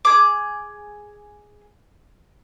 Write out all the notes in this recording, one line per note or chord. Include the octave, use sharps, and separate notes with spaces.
G#4 D6